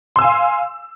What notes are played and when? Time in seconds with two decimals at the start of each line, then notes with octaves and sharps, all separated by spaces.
0.16 C6
0.19 E6
0.21 G#5
0.24 F5